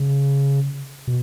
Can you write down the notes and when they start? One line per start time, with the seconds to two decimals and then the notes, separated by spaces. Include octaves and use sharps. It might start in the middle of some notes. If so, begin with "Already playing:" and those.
Already playing: C#3
1.07 B2